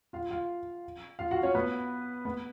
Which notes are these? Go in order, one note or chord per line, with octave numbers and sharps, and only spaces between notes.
F4 F5
F4 F5
F4 F5
F#4 F#5
C#4 C#5
B3 B4
B3 B4